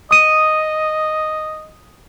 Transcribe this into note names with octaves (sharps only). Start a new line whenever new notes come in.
D#5 D#6 D#7